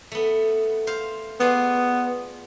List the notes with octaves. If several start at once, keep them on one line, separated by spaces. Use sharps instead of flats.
A3 B3
C5 F5
B3 F4 G#4 D5